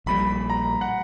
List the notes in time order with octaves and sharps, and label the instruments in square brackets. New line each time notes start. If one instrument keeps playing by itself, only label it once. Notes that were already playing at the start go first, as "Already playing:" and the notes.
[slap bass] A#1 A#2 G3 [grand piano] B5
[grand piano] A#5
F#5